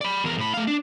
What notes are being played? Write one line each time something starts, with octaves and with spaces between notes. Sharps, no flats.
D5 B5
E2 A#4
A2 B5
A3 F5
D4